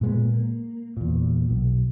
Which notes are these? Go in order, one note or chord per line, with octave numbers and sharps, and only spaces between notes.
A#2 G#3 B3
A#3
E2 A#2
B1